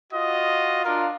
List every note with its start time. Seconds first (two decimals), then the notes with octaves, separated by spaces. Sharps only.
0.12 F4 F#4 D#5
0.85 D4 F4 A#4